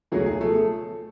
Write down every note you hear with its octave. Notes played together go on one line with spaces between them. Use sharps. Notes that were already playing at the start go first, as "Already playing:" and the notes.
C#2 B2 F#3 A3 G#4
G#4
F3 A3 A4